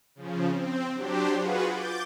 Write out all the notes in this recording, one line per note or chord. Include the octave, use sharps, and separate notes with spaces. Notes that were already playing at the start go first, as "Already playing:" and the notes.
C#3 F3
C4
F#3 D4 G4 C5
F4 F#4 G#4 B4 F#5
D6 G6 A6